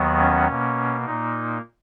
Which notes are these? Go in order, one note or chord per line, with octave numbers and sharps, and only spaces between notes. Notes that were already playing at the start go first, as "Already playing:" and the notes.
Already playing: D#2 D#3 F#3 B3
C#4
B2 A#3
A#2 A#3 D#4